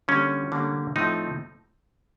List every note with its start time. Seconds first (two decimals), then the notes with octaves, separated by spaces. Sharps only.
0.08 D3 G3 A#3 C#4
0.52 D3 G3 A#3
0.96 A2 F3 A3 C4 D#4